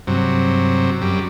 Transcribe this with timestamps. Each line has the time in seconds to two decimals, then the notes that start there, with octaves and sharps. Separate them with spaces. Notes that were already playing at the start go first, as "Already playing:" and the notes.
0.07 G2 C3 F#3
1.01 F#2 G3